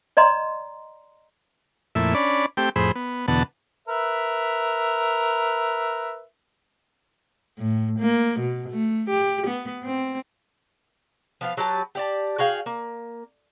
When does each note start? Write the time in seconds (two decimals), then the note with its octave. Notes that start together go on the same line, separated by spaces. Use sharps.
0.17 D5 D#5 A#5 C6
1.95 F2 A#2 A3 E4 E5
2.14 C#4 D4 D5 B5
2.57 A3 C4 G4 G5
2.76 F2 A2 G#4 C5 B5 E6
2.95 B3
3.28 E2 B2 D3 B3 F#5 A5
3.88 A#4 B4 E5
7.58 A2
8.00 A#3
8.40 B2
8.70 A3
9.10 G4
9.47 B3
9.83 C4
11.41 F3 B3 F5
11.57 F#3 G4 B4 A5
11.95 G4 D5 A5
12.38 F#4 G#4 F5 G5
12.66 A#3